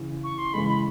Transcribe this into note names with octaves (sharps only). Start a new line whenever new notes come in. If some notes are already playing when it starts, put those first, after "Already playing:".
Already playing: C#3 E3
C#6
C6
C#3 E3 G#3 B5
B5